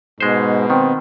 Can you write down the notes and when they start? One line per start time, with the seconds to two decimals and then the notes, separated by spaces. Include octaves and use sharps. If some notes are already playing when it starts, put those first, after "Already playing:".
0.20 G#2 B2 G#3 C5
0.70 D#3 C4